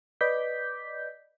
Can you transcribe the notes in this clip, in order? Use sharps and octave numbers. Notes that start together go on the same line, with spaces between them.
B4 D5 D#5 D6 G6 B6